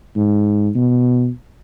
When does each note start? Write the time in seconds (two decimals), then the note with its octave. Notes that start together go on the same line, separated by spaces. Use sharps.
0.16 G#2
0.75 B2